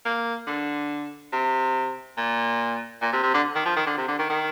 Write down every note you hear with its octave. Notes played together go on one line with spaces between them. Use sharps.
A#3
D3
C3
A#2
A#2
C3
C3
D3
D#3
F3
D#3
D3
C3
D3
D#3
D#3